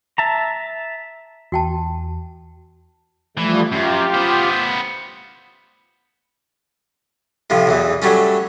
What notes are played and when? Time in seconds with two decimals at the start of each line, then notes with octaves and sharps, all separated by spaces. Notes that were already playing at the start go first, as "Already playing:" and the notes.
0.18 E5 A5 A#5
1.52 E2 F#4 G5 A5
3.37 E3 F3 G3 A3
3.71 F#2 F4 G4
4.14 B3 C5
7.50 A2 C3 F3
7.67 B1 E2 E3
8.02 F#3 G3 A3 C#4